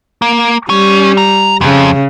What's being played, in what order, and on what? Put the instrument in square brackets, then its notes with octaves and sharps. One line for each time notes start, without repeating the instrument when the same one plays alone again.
[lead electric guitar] A#3
[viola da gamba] G3 [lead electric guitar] C#4
[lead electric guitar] A#5
[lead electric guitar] F2 [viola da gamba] C#3